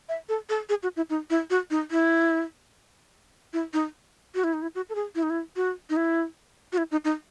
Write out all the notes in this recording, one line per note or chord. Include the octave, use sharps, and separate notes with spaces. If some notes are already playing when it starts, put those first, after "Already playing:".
E5
A4
A4
G#4
F#4
E4
D#4
E4
F#4
D#4
E4
E4
D#4
F#4
E4
D#4
E4
F#4
A4
G#4
E4
D#4
E4
F#4
D#4
E4
F#4
E4
D#4
D#4